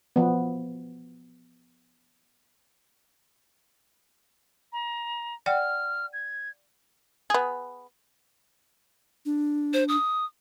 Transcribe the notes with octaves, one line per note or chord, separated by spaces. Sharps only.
F3 B3
A#5
D5 F#5 G5 F6
G#6
B3 G#4
D4
C5
D#6